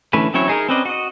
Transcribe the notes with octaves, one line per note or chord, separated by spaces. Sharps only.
D3 E3 A3 C#4 B4
F#3 C4 C#4 E4 C#5
D#4 G#4 A#4
C4 C#4 B4 D5 D#5
F#4 D#5